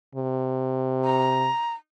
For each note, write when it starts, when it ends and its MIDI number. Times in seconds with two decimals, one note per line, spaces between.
0.15 1.48 48
1.04 1.74 82